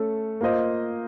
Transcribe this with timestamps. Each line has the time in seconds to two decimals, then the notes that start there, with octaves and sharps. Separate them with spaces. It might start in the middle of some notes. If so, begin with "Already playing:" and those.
Already playing: A3 C#4 A4
0.41 A#3 F4 C5 D#5